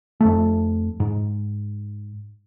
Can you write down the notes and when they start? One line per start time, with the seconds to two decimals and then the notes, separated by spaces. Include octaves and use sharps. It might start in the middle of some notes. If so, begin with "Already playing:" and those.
0.20 F2 A3
1.00 G#2